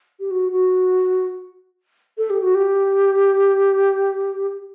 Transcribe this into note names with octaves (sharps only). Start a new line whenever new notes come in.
G4
F#4
F#4
A4
G4
F#4
G4